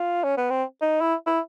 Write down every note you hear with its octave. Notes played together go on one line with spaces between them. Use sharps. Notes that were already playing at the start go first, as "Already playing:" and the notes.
Already playing: F4
C#4
B3
C4
D#4
E4
E4